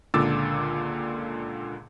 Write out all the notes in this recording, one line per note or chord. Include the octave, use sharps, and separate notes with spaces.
C#2 A#2 D3 D6 E6 A6